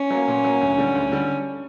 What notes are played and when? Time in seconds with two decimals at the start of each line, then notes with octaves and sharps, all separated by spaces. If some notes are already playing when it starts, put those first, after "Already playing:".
Already playing: C#4
0.11 F#3 A#3
0.28 A#2
0.45 F#3 A#3
0.61 D2
0.78 D3 G3
0.95 D2
1.12 D3 G3